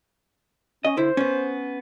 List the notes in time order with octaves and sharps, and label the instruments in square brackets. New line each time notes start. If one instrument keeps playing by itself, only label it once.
[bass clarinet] C#4 [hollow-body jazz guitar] D#5
[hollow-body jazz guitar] D3 E4 [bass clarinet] C5
[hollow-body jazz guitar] B3 C#4